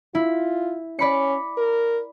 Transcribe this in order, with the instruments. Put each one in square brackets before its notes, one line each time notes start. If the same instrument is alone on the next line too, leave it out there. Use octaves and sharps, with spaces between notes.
[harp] E4 [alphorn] F4
[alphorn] C#4 [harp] D5 B5 C#7
[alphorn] A#4